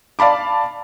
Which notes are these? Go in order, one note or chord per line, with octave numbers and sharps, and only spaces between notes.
D5 F5 A5 B5 D6